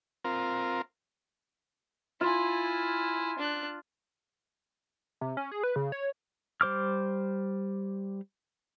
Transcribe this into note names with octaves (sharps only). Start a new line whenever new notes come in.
C4 F4 A#4
E4 F4 G#5
D4 F#6
C3
C#4
G#4
B4
C#3
C#5
G3 C5 D6 F6